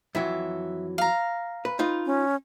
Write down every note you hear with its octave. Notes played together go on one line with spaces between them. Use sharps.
F2 E3 F#3 E5
F5 A#5
B4
D#4 F4 B4
C#4